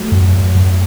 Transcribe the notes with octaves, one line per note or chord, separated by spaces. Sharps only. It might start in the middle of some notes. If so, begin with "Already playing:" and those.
Already playing: F#3 A3
F#2
F#2
F#2